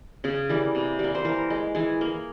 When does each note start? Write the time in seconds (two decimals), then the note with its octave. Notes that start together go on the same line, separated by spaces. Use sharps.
0.24 C#3 G#4
0.49 E3 G3 A#3
0.75 C3
0.99 G3 A#3
1.15 C5
1.25 E3 A#4
1.50 G#3
1.75 E3 G#4
2.01 A#3